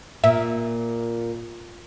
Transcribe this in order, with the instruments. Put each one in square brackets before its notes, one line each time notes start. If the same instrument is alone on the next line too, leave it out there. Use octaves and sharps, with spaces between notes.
[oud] A#2 [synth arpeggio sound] E5